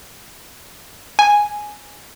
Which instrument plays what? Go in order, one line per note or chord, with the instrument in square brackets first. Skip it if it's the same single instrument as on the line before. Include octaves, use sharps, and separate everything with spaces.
[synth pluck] G#5